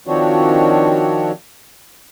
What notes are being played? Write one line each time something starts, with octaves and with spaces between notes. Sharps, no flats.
D#3 F3 C4 D4 F#4 C#5